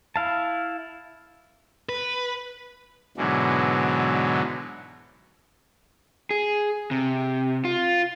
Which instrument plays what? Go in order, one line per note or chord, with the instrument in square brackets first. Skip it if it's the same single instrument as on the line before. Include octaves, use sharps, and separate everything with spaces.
[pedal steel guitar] E4 F5 A5
[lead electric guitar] B4
[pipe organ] G#2 B2 D3 E3 F#3
[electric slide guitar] G#4
C3
F4